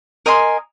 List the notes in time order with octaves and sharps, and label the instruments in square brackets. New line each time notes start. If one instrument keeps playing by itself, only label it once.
[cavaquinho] A#4 D#5 G#5 C6